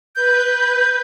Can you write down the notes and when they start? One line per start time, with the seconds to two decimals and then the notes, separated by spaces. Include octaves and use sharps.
0.16 B4 G6